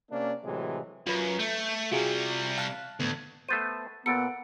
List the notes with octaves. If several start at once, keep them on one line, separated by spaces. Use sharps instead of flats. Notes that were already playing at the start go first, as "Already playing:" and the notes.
C3 A#3 C#4 D4
A2 C3 E3 F#3 G#3
F#2 F4 B4
A3 G6
C3 G3 F4 F#4 G#4
F5 A5 F#6
D2 A2 B3
A3 B3 C5 A6 D#7
A#2 B3 A4 C#7 D7